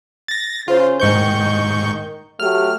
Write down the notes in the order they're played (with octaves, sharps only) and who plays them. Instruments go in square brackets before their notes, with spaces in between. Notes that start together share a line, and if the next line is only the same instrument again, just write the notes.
[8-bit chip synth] A6 A#6
[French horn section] C#3 C5 [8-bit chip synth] F4
[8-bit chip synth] G#2 C#6 G6 [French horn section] D#3 D#5
[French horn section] F#3 A3 G4 [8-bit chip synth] F6